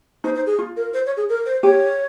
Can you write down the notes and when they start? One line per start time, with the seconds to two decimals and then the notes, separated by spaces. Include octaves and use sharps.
0.24 D#4 C5
0.35 C5
0.47 G#4
0.59 F4
0.77 A#4
0.94 C5
1.06 C#5
1.17 G#4
1.29 A#4
1.46 C5
1.63 G4 C#5